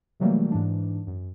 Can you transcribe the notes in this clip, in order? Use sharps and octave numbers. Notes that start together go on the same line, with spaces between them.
C3 E3 F#3 G3 A3 A#3
G#2 E3 D4
F#2